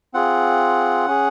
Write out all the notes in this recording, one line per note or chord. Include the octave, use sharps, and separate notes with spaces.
C4 F4 G#4 F#5
C#4 G#4